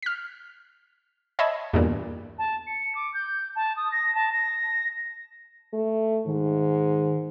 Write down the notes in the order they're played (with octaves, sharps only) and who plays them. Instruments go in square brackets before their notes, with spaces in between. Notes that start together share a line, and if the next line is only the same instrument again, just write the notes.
[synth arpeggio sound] F6 B6
C#5 D#5 E5 A5 B5 G#6
E2 G2 A#2
[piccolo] A5
C#7
D6
G6
A5
D#6
A#6
A5
A#6
[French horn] A3
[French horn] G#2 [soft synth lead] D#3